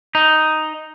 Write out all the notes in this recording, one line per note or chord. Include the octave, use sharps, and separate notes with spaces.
D#4